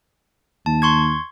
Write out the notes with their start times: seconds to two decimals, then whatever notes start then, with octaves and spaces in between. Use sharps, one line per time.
0.66 D#2 A5
0.82 C6 C#6 G#6